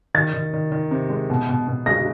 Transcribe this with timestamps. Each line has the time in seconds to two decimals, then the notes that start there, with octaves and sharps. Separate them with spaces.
0.14 D#3 A6
0.33 D#3
0.53 D#3
0.72 D#3
0.91 C3
1.10 G#3
1.30 B2
1.49 B2
1.68 B2
1.86 G#3 A#6